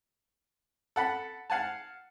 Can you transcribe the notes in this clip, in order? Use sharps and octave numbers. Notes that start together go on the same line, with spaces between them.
A4 F#5 B5
F5 F#5 G#5 A5